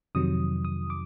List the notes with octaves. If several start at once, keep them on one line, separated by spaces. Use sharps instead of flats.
F2 C3 D#3 F#3 D#6
D#6
D6